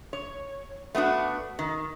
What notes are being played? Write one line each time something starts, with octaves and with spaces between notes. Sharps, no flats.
C#5
A3 B3 D4 F#4
D#3